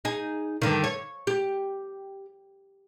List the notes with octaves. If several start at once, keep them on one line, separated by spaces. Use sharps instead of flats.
D#4 G#4
G2 D3 D#3
C#5
G4